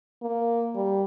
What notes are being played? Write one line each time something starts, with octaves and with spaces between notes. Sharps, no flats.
A#3
G3